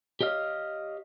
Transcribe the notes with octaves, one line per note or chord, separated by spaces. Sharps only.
G4 C#5 D#5 F5